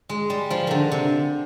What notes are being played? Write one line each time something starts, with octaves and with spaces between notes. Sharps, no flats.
G#3
G3
F3
D3 D#3
C3